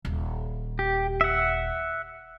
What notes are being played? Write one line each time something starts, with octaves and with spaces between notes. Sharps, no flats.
D#1
G4
E5 F#5